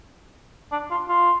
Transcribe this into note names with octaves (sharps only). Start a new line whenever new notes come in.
D4
F4
F4